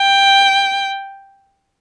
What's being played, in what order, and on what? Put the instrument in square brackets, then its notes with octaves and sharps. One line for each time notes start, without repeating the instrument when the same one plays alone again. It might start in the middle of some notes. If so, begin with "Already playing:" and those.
Already playing: [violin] G5